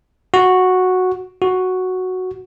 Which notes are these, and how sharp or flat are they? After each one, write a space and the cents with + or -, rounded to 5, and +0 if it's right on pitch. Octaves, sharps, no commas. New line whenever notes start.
F#4 -5
F#4 +0